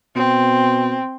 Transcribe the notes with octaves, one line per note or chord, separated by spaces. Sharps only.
B2 C4